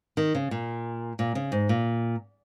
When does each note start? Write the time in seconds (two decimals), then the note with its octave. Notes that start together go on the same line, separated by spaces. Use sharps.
0.17 D#3
0.35 C#3
0.51 A#2
1.19 A#2
1.35 C#3
1.52 G#2
1.69 A#2